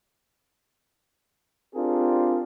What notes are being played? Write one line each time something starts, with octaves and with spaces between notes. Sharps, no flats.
C4 D4 F4 G4 G#4 A#4